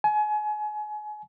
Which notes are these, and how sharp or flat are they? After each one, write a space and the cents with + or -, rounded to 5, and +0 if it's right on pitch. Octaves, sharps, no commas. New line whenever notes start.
G#5 +30